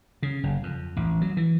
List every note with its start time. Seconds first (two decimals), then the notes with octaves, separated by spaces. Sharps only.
0.23 C#3
0.43 F#1
0.63 F2
0.96 A1
1.21 F#3
1.37 E3